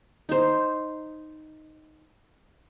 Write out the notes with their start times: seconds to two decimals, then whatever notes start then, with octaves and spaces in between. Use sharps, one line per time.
0.29 D#4 C5